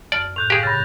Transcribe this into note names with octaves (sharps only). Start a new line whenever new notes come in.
F#2 D5 A5 F6
A2 F#6 G6 F7
G4 G#4 F5 C#6 A#6
G2 C#3 A6 A#6